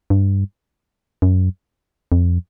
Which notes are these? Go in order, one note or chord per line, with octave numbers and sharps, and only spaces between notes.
G2
F#2
F2